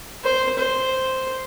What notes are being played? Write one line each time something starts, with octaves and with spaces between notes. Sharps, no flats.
C5
C5